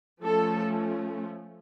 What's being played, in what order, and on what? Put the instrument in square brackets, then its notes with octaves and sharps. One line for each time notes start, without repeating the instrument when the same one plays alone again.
[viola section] F3 A3 C#4 A4